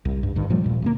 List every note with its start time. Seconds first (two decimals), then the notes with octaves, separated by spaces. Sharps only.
0.05 C2
0.23 G2
0.36 A1 G2 D#3
0.50 A#2 F3 G3 A3
0.64 D#1 A#2
0.82 D2 A3 A#3